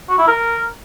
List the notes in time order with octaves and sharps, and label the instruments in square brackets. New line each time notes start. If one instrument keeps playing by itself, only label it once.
[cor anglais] F#4
E4
A#4